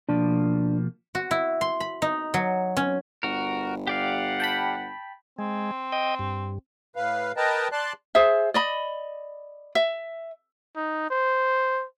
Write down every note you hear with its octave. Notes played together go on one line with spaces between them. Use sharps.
B2 F3 A#3 D4
F#4
E4
C6
B5
D#4
F#3
C#4
G1 F#4 A#4
G4 D5 F5 F#5
G5 A5 B5
G#3 C4
D#5 G5
G2
A2 B4 F5
A#4 B4 D#5 G5 A5 A#5
D5 A5 C6 F#6
G#4 C5 E5
D5 D#5 B5
E5
D#4
C5